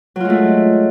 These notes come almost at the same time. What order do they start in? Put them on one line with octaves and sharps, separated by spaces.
F#3 F4 G#3 A3